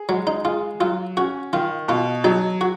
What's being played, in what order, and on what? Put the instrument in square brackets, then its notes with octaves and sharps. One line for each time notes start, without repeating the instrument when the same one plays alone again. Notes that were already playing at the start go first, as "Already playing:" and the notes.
Already playing: [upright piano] G#4
[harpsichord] F#3 [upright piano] G#3
[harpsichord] D#4
[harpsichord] F4 [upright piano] G#4
[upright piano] F#3 [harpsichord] F4
[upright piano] C#4 [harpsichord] F#4
[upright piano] D#3 [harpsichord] F4
[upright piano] B2 [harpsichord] F4
[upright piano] F#3 [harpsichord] D#4
[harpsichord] F#4